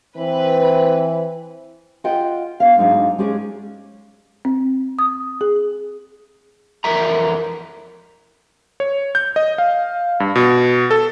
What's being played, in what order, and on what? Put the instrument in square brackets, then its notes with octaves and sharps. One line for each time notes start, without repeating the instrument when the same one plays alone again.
[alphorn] E3 [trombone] C4 [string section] B4
[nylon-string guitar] F4 D#5 F#5 G5
B3 F5
D2 G#2 D3 F#3 D#4 F5
G#3 C#4 G4 G#4 D5
[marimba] C4
D#6
G#4
[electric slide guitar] F2 E3 A#4 E5 A#5
[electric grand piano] C#5
G6
D#5
F5
G2
B2
A4